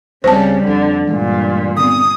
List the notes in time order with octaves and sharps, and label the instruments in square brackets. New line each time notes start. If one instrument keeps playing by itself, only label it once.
[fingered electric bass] C#2 F3 C4 [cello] C#3 G3 [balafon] C5 A5
[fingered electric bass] F1 F2 [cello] D3
[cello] G2 A#2 [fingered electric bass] E3 G#3 A3
[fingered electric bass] D3 B3 C4 [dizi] D#6